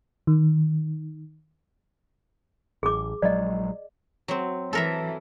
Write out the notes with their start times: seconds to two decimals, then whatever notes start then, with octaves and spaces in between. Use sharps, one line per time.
0.27 D#3
2.83 A1 G#4 D6
3.22 A#1 F#3 G#3 D5 D#5
4.28 F#3 C4
4.73 E3 A4 A#4 E5